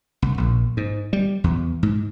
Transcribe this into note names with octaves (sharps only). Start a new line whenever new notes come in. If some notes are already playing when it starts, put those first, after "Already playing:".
C2
A#1
G#2
G3
E2
G#2